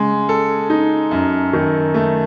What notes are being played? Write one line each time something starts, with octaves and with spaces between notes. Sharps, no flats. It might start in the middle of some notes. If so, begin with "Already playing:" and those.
Already playing: C#3 G#3
A4
D#4
F#2
D#3
A3